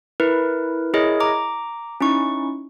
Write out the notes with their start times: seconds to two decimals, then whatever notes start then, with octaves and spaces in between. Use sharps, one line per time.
0.20 E4 A#4 B4
0.94 E4 G#4 A#4 C#5 D#5
1.20 A#5 D6
2.01 C#4 D#4 E4 C#6